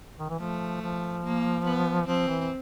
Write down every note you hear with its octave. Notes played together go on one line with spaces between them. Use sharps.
D#3
E3
F3 A3
F3
A#3
B3
F3 C4
E3